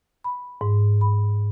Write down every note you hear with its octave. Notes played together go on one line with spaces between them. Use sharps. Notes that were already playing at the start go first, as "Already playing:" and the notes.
B5
G#2
B5